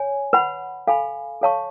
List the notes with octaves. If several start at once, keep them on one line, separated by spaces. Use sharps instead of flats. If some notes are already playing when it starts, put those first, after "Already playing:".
Already playing: C#5 G#5
B4 F#5 B5
A4 F5 G#5 B5
A4 C#5 F5 A5 C#6